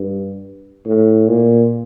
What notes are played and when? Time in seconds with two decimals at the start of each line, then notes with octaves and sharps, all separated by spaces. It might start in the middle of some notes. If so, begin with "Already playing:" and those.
Already playing: G2
0.86 A2
1.28 A#2